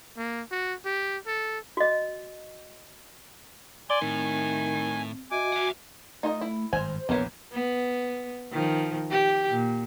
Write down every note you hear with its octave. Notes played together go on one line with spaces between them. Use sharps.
A#3
F#4
G4
A4
F#4 D#5
D5 G#5 C6
A2 D#3 C4
F#4 D#5 E5 G#5 D6
F#4 E5 F#5
A3 D#4 F4 D#5
E4
G#1 G2 C5 G#5
A#1 E2 C3 E3 B3 A#4 C#5
B3
D#3 F3
G4
A#2